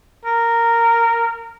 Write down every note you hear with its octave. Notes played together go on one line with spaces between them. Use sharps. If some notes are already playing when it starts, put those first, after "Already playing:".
A#4